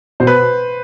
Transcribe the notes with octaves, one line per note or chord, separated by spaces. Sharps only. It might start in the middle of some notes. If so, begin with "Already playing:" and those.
B2 C5
B4